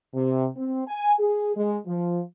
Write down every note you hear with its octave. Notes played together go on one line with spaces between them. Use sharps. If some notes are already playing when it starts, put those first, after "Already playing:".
C3
C4
G#5
G#4
G#3
F3